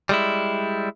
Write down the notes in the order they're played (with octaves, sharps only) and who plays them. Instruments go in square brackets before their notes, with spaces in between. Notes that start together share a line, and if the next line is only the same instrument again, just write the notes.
[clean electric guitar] G3 G#3 E4